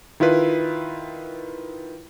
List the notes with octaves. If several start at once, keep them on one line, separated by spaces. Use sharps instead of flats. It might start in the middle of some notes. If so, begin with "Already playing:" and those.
D#3 E4 F4 B4